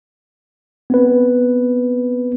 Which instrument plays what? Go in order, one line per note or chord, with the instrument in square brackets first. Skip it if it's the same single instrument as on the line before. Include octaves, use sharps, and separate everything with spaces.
[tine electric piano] B3 C4 B4